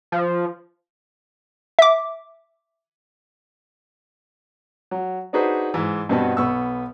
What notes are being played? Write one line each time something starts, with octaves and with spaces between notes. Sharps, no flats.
F3
E5 D6
F#3
D4 D#4 F#4 G#4 B4 C5
G#2 E3
G2 B2 B3 C4 F#4 A5
B1 B3 C#6 E6